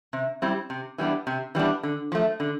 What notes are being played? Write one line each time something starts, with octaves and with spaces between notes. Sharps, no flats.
C3
G3 C4 E4
C3
E3 G3 B3 D4
C3
E3 G3 B3 D4
D3
F3 A3
D3